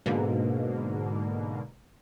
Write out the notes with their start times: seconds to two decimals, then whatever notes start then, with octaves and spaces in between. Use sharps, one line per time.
0.06 G#2 B2 D3 A#3